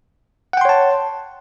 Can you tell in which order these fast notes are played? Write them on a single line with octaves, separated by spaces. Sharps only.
F#5 G5 C6 C#5 A5